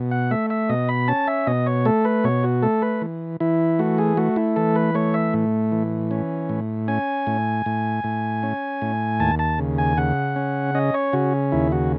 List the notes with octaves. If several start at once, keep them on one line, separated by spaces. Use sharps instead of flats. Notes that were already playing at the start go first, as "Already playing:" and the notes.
Already playing: B2
F#5
A3 E5
E5
B2 D#5
B5
C#4 A5
E5
B2 D#5
C#5
A3 A4
B4
B2 C#5
F#4
A3 A4
B4
E3
E3 E4
A3 F#4
G#4
A3 F#4
E4
E3 A4
B4
A3 C#5
E5
A2
E3
C#4
A2
C#4 G#5
A2
A2
A2
C#4
A2
D#2 A5
A5
C#3
G#5
C#3 F#5
C#4
C#4 D#5
C#5
C#3 F#4
D#2 E4
F#4